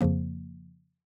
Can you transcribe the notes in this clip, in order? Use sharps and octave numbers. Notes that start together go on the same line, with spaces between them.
F2 C#3 F3 A#3